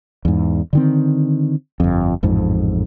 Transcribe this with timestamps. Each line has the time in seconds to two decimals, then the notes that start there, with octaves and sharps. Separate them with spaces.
0.25 E2 G#2
0.73 D3 D#3 C4
1.80 G1 F2
2.23 A1 F2 G#2